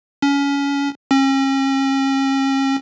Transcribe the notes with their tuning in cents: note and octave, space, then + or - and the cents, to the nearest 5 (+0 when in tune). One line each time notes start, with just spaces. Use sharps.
C#4 +25
C#4 -40